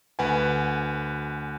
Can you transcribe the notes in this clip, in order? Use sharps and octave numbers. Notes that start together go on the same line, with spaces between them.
D2 B4 F#5 G#5